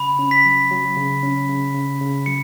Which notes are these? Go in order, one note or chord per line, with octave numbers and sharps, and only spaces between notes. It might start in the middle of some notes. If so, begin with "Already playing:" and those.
Already playing: C#3 B5
C#4
B6
F#3
F#3
C#3
C#4
C#3
C#3
C#3
F#3 C#7